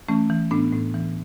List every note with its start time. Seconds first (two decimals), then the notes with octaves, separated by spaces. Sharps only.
0.08 E3 A3 C#4
0.30 E3
0.51 A2 B3 D4
0.73 A2
0.94 E3